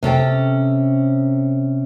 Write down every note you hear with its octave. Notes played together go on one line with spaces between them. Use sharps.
C3 C#4 A4 G5